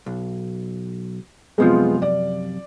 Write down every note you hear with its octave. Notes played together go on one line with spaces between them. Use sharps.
B1
F#2 C3 F3 G#3 B3 F4
D5